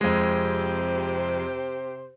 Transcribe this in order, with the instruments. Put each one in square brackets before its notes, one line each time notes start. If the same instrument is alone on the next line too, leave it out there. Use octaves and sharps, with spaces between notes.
[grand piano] F2 G#3 [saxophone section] C3 G4 C5